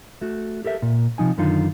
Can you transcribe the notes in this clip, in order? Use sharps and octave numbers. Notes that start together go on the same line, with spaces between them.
A3 F#4
G4 A4 A#4 E5
A#2
C3 F3 D#4 G#5
F#2 D3 D#3 D#4 F4